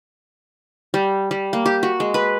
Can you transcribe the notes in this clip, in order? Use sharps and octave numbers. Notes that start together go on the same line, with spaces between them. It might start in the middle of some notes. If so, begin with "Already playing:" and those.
G3
G3
A#3
G4
F#4
G#3
B4